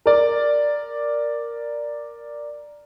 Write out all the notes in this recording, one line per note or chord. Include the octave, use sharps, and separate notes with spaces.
A#4 D5